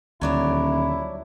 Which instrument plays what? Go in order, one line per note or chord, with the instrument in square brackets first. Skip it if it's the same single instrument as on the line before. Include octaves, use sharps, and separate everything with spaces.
[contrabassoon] D#1 [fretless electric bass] D2 [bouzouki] F#3 D4 C#5 [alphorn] E4